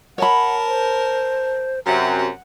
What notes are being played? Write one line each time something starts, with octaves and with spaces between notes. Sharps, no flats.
A#4 C#5 F#5 A5 B5
C5
F#2 C3 F#4 F#5